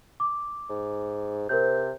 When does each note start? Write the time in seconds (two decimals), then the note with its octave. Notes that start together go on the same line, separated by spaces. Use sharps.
0.20 D6
0.69 G#2
1.49 C3 A#4 C5 G6